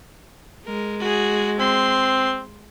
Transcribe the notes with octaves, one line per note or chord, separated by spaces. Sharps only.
G#3 A#4
F#4 G#4
C4 C6